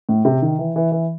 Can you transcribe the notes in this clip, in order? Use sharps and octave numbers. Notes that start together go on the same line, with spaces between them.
A2
C3
D#3
E3
E3
E3